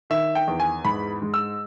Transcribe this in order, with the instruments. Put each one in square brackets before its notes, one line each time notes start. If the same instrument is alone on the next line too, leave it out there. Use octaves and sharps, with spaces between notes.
[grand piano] D#3 E5
G5
E2
G#5
G#2 B5
G#3
E6